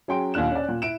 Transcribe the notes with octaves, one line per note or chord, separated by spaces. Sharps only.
F#3 C#4 G#4 G5 C6 D7
D#2 A#2 D4 F#6 E7
C#4 D5
A#2
E4 D7 E7